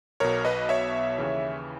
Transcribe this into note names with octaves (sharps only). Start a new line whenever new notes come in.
B1 B2 A#4 C#5
B4 D#5
C#5 E5
D#2 C#3 E3